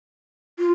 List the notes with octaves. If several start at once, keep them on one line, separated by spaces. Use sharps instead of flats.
F4